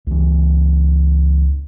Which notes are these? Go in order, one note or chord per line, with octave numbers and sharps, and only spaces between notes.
C#2 E3